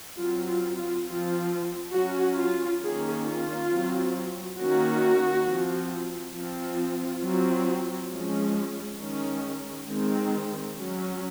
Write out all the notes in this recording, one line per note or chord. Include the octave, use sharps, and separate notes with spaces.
F#3 C4 F4
F4
F4
F3 C4 F4
F#3 C#4 F#4
F4
D#3 A#3 C#4 G#4
F4
F#3 C4
D#3 A#3 C#4 F#4
F3 C4
F3 C4 F4
F#3 C4
F3 G#3 C#4
D#3 G#3 C#4
D#3 G#3 C4
F#3 C#4